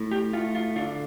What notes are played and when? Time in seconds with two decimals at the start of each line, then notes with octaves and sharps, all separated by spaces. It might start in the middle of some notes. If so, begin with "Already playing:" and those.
Already playing: A2
0.11 G4
0.33 A3 F4
0.55 F4
0.76 D3 F4